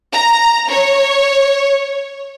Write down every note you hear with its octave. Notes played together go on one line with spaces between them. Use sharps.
A#5
C#5